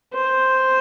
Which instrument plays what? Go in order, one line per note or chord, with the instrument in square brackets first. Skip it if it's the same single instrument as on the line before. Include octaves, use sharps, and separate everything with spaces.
[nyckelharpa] C5